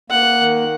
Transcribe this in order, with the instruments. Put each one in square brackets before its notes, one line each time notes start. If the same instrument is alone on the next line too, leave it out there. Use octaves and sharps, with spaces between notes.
[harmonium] A#3 [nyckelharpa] F#5
[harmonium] D#3